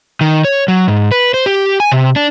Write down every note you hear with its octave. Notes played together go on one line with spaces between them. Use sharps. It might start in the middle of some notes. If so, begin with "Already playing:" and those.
D#3
C#5
F#3
G#2
B4
C5
G4
G#5
C3
D4